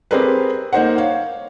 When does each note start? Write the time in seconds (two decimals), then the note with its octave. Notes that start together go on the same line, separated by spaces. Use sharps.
0.11 C4 G4 G#4 A#4 B4
0.73 A#3 D#4 C5 F#5
0.98 C#5 F5